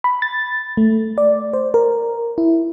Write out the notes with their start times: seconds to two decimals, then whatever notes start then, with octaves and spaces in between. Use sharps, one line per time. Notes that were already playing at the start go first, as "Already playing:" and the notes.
0.04 B5
0.22 A6
0.77 A3
1.18 D5
1.53 C5
1.74 A#4
2.38 E4